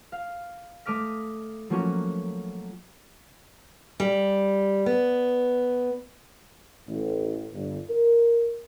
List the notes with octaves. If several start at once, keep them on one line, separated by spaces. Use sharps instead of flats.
F5
A3 D#5 D6 F6 B6
F3 F#3 A3 A#3 C#4 F#4
G3
B3
A1
G1
A#4